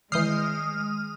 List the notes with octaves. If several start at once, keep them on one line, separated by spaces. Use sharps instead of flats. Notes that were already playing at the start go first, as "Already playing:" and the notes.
D#3 E3 G#3 D#6 F6 G6 C7